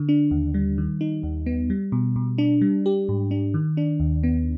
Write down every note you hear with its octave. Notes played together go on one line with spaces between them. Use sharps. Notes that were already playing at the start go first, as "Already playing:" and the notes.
Already playing: D3
D4
D#2
G3
D#3
D#4
D#2
B3
G3
B2
B2
D4
G3
G4
G#2
D4
D#3
D4
D#2
B3